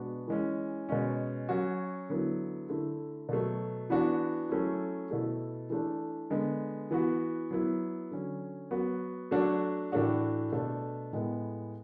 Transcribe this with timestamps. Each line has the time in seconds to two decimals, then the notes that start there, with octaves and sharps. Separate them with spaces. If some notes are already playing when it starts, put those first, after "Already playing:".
Already playing: B2 G#3 B3 D4 F#4
0.28 E3 G#3 C#4
0.89 B2 G#3 C#4
1.49 F#3 C#4 F#4
2.09 D3 F#3 B3 E4
2.69 D3 A3 E4
3.29 B2 F#3 A3
3.90 E3 B3 D4 F#4
4.49 F#3 A3 C#4 E4
5.10 B2 A3 E4
5.70 E3 A3 D4
6.30 D3 G#3 B3
6.91 E3 B3 F#4
7.51 F#3 B3 E4
8.11 D3 F#3 C#4
8.71 F#3 B3 F#4
9.31 F#3 A3 D4 F#4
9.92 A2 E3 A3 D4 F#4
10.52 B2 A3 D4
11.13 A2 G#3 B3